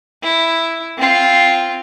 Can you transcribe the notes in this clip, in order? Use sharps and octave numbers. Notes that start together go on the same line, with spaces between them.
E4
C4 F4